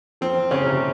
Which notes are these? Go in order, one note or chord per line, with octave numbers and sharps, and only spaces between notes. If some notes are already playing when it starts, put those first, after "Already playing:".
F3 C4
C#3 C#4
C3